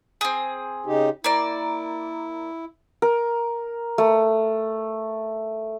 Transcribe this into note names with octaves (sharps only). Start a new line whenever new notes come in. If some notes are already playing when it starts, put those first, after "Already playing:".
C4 G#4
C#3 D#4 G4
A#3 E4 D5
A#4
A3